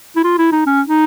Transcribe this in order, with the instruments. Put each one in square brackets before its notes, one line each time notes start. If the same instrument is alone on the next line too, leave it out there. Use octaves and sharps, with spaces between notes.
[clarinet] E4
F4
E4
D#4
C#4
D#4